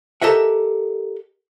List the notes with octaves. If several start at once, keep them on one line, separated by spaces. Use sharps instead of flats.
G4 A4 A#4 D#5 E5 F#5